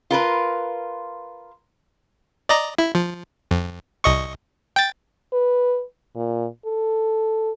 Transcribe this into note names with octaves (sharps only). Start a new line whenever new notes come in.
F4 A#4 B4
D5 D#5 A#5
E4
F3
F2
C2 D#5 C#6
G5 A6
B4
A#2
A4